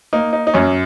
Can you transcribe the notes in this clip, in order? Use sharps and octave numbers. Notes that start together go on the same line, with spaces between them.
A#3 D#4
D#4
D#4
F#2 C#4